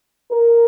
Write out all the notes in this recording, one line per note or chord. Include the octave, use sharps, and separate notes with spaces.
A#4